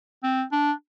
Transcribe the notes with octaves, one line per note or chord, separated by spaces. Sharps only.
C4
D4